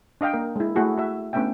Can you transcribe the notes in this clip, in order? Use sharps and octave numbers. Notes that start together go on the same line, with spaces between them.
D4 D#5 F5 G5
A#3 A#4
G#3 E4
A3 E4 F#4 G#4
F#4 E5
A3 B3 C#4 D4 E5 G5